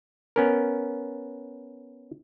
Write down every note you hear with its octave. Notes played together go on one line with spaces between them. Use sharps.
B3 C#4 A#4